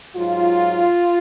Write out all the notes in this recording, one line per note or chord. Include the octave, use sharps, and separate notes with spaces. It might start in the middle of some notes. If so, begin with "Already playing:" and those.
G#2 F#3 F4